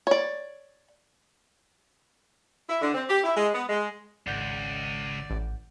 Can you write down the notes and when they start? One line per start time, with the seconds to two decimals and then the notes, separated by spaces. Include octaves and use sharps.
0.07 C#5 D5
2.68 E4
2.82 D3
2.94 C4
3.09 G4
3.24 E4
3.36 G#3
3.53 B3
3.69 G#3
4.27 G#1 C#2 D5 F#5 G6
5.30 A1